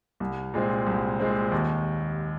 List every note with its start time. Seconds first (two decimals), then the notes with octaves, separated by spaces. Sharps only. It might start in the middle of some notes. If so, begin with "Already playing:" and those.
0.20 C2
0.54 A#2 G#3 C4
0.86 C2
1.20 A#2 G#3 C4
1.52 D#2